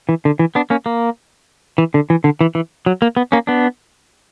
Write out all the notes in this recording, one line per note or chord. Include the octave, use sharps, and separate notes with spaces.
E3
D3
E3
B3 D4
A#3 C#4
A#3
E3
D3
E3
D3
E3
E3
F#3
A#3
B3
A#3 C#4
B3 D4